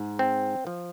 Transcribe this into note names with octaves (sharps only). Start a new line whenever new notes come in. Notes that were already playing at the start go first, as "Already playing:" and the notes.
Already playing: G#2
C4
F3